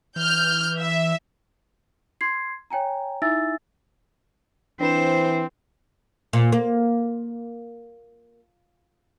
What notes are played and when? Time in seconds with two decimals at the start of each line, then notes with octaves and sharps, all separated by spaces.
0.16 E3 F6 G6
0.79 E5
2.21 C6 G#6 C7
2.70 C#5 G5 G#5 A#5
3.22 D#4 E4 E5 G#5 E6 A6
4.81 E3 C4 D4 B4 C5 E7
6.33 A#2
6.52 A#3